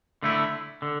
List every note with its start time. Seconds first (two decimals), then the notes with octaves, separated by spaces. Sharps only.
0.23 D3 A3 E4
0.82 D3